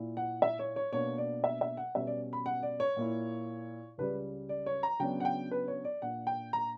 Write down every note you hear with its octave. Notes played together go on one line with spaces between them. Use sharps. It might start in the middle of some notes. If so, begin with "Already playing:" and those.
Already playing: A#2 A#3 E4
F#5
E5
C#5
C#5
B2 A#3 D4 C#5
D5
E5
E5
F#5
B2 G3 C#4 E5
D5
B5
F#5
D5
C#5
A#2 A#3 E4
C#2 C#3 G3 B4
D5
C#5
A#5
C#3 F#3 B3 D4 G5
F#5
G5
B4
C#5
D5
A#2 A#3 D4 F#5
G5
A#5